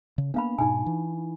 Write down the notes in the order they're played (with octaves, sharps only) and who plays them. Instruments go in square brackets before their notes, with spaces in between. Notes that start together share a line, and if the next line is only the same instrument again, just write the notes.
[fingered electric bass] C#3
[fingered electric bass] A#3 B3 [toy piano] D4 F5 B5
[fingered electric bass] G#2 B2 [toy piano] D#4 G#5
[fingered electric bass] E3